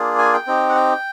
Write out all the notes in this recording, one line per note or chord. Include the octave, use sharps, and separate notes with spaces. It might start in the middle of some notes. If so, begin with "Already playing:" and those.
Already playing: A#3 D4 F4 G#4
G#5
G5
C4 D#4 G4
F#5
G5